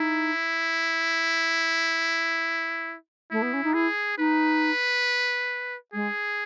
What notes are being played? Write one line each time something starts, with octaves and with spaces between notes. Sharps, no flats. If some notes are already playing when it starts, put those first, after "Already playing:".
Already playing: D#4 E4
A3 E4
B3
C#4
D#4
E4 G#4
D#4 B4
G#3 G#4